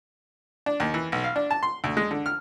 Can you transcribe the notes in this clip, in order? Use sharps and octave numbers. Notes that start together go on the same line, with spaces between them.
D4
D#2
E3
B1
F5
D4
A5
C6
D2
G#3
D3
F6